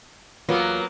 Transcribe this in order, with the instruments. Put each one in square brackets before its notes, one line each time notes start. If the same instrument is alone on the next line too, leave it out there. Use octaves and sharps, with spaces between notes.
[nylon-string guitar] E2 F4 [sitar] F#3 A#3 B3